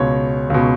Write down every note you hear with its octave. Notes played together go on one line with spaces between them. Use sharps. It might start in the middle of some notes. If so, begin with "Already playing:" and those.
Already playing: C#2 B2 C#5
C#2 B2